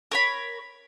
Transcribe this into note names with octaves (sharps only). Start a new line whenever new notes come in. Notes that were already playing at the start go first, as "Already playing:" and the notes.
A#4 C#5 B5